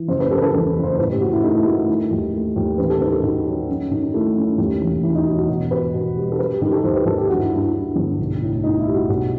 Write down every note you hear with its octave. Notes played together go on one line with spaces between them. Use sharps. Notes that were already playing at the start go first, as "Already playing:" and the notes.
Already playing: E3
F#1 C5
B4
F#1 A4
B4
A4
E2 A4
F#1
C5
A2 B4
G4
A2 F#4
E4
A3 D#4
E4
A3 F#4
E4
D#3
D#2
A3
D#2
A1 B4
A4
D#3 B4
A4
D#3 F#4
F#3
F#2
D#3
A3 E4
F#2
D#2
E1
E1 E4
D#4
F#3 E4
F#4
B2 F#4
B2 B4
B2
G3
A4
F#3 B4
G4
D#3 G4
A4
D#2 C5
B4
D#2 A4
G4
G2 F#4
E4
G2 E4
E4
G2
G1
B1
A2
A2 D#4
E4
G3
F#4
B1 F#4